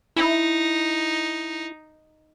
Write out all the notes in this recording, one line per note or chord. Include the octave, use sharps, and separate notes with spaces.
D#4 E4